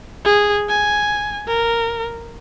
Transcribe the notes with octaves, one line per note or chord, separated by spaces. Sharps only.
G#4
G#5
A#4